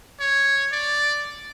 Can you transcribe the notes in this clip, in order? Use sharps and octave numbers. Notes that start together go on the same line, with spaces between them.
C#5
D5